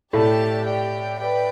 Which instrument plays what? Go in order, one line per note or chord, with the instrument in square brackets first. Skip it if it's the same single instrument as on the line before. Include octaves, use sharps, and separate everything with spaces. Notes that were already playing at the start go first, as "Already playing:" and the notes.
[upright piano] A2 A3 [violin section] G4 D5 A5
[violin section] G4 D5 G5
B4 D5 G5